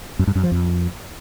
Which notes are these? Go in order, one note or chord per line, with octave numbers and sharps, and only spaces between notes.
F#2
G2
F#2
F3
F2